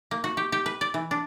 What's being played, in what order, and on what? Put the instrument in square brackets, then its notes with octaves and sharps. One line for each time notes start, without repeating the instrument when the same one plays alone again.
[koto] A#3
F#4
G4
G4
B4
D5
E3
D4